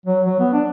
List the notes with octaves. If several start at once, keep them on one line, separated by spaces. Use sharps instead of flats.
F#3
F#3
B3
D4